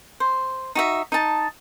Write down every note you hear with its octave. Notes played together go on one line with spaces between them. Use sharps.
C5
D#4 F#4 E5
D#4 A5